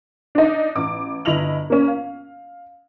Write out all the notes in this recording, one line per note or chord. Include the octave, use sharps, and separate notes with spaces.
D4 D#4
A1 D6
G1 E4 D#5 F7 F#7
A#3 C#4
F5